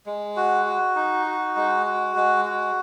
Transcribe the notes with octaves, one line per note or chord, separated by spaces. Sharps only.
G#3
F#4
F#4
D#4
F#4
G#3
F#4
G#3
F#4